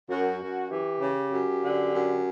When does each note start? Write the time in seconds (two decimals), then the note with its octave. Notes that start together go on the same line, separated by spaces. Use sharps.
0.08 F#2 F#4
0.39 F#2
0.70 E3 G4
0.99 C#3
1.31 F#2
1.62 D3
1.91 F#2